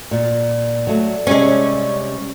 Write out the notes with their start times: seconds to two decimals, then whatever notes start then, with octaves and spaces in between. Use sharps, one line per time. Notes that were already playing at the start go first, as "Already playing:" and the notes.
0.11 A#2 D5
0.87 F#3 A3
1.27 C3 G3 G#3 C#4 G#4